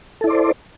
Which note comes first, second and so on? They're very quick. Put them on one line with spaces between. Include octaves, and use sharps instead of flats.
A4 E4 D5 C5